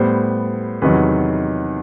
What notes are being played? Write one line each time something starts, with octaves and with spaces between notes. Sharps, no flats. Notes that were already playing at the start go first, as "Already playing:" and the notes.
Already playing: A2 G3 B3 C5
E2 C3 D#3 F#3 B4